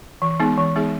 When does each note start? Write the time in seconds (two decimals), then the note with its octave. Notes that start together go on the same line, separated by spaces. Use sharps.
0.22 E3
0.39 G#3 B3 D#4 G#4
0.57 E3
0.76 G#3 B3 D#4 G#4